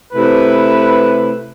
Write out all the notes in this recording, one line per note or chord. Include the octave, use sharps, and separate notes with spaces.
C3 A3 E4 B4